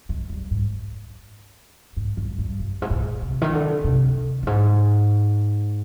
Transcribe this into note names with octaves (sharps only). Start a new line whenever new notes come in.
G#3
G3
G#2
G#2
G2
G2
G2
G#2
A#2
C3
D#3
D3
C3
G2
G#2